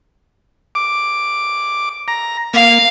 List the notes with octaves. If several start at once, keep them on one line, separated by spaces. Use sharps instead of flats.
D6
A#5
A#3 F5